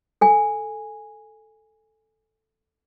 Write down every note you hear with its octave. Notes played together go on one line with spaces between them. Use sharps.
A4 G#5